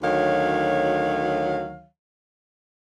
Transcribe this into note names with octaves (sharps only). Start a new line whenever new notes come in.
D2 D#3 F#3 C#5 F5